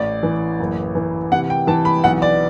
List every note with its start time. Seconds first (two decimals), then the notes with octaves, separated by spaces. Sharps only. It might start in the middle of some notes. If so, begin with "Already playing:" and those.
Already playing: A1 D5
0.23 E3
0.60 F#1
0.95 E3
1.32 C3 F#5
1.50 G5
1.67 E3 A5
1.85 B5
2.04 B1 F#5
2.22 D5